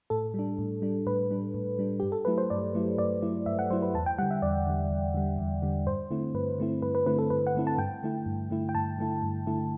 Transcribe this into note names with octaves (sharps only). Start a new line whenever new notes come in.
A2 A4
G3 D4
A2
G3 D4
A2 B4
G3 D4
A2
G3 D4
G2 G4
A4
F#3 A3 E4 B4
C5
G2 D5
F#3 A3 E4
G2 D5
F#3 A3 E4
G2 E5
F#5
F#3 A3 E4 C5
B4
E2 A5
G5
D3 G3 F#5
E5
E2 D5
D3 G3
E2
D3 G3
E2
D3 G3
G2 C5
D3 A3 C4 E4
G2 B4
D3 A3 C4 E4
G2 B4
B4
D3 A3 C4 E4 B4
A4
G2 B4
F#5
D3 A3 C4 E4
A5
G2 G5
D3 A3 E4
G2
D3 A3 E4
G5
G2 A5
D3 A3 E4
G2
D3 A3 E4